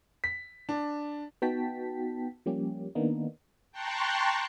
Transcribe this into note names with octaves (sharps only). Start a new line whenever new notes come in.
B6
D4
B3 D#4 F#4 G5 A5 B6
F3 G3 A#3 C#4 G4
D#3 A#3 B3 D4 D#4
G5 A5 A#5 C6 C#6 F#6